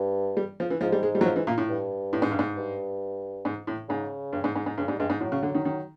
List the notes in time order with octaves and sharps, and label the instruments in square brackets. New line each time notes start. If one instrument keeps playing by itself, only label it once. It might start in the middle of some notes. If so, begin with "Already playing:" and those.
Already playing: [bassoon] G2
[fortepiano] G3
F3
E3
[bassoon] G#2 [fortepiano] F3
[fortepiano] G3
G#3
G3
F#3
F3
E3
A#2
A2
[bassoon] G2
[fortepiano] A2
G#2
G2
G#2
[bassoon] G2
[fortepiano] G#2
A2
[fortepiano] G#2 [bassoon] C#3
[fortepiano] G2
G#2
G#2
G#2
[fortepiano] G2 [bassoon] C#3
[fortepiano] G#2 [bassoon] G3
[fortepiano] G2 [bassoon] G#3
[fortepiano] G#2
[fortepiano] A2 [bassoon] F#3
[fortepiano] C#3
D3
D#3
D#3